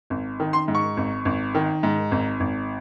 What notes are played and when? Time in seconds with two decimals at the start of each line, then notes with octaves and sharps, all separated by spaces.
0.10 G#1
0.40 D#3
0.53 C6
0.68 G#2
0.75 C#6
0.97 G#1
1.25 G#1
1.55 D#3
1.83 G#2
2.11 G#1
2.40 G#1